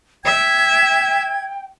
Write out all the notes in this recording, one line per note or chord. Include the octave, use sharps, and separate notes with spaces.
E5 G5 G#6